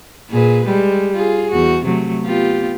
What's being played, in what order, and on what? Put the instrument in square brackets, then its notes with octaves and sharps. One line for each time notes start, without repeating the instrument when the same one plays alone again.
[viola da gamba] A#2 G#4 B4
G3 G#3
F4 G#4
E2 F#4
C3 F#3 A3
B3 F4 G4